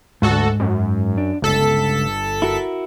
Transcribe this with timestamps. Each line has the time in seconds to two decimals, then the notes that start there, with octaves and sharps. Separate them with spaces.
0.22 D2 G#2 F#4 A4
0.60 F#2
1.18 D4
1.42 G1 C#2 A4 B6
2.42 E4 F#4 A#4